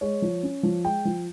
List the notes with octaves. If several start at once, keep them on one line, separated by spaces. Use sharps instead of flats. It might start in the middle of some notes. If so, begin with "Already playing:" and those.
G#3 C#5
F3
C#4
F3
G#3 G5
F3